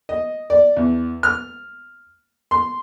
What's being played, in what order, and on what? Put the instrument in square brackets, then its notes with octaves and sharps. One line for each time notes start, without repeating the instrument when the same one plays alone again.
[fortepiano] D#5
D5
E2
F6
C6